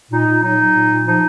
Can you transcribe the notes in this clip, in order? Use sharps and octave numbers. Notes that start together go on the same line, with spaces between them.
A#2 D#4
A#2
F#3 D#4
F#3
A#2
A#2
F3 D#4